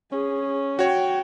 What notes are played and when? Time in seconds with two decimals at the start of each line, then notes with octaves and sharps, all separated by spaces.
0.12 C#4 G#4
0.79 F#4 C#5 G5